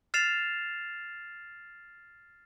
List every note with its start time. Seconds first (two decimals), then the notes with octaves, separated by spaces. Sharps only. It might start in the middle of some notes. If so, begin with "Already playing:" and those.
0.14 F6 A6 C7 E7 F7